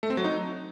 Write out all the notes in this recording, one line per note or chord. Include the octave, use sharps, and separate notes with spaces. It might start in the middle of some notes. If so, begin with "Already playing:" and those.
A3
C4
F#3
D#4